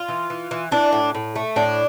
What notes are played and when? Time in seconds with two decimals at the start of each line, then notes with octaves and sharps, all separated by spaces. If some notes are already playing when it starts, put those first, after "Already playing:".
Already playing: F4
0.08 E3
0.30 E3
0.51 E3
0.71 E3 D4
0.92 A2
1.15 A2
1.36 A3
1.56 A2 D4